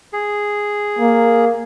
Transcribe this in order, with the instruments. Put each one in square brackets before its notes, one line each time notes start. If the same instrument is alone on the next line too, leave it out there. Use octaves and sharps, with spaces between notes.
[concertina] G#4
[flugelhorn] A#3